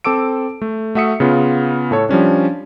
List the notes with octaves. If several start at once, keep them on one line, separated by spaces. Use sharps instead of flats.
C4 A4 D6 E6 D7
A3
A3 F#4 E5 D#6 C#7
C#3 B3 F4
A2 A4 C#5
F3 G3 C#4 D4